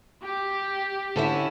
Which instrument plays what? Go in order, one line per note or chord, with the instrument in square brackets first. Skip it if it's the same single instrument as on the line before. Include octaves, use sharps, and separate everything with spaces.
[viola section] G4
[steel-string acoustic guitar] D3 C#4 E4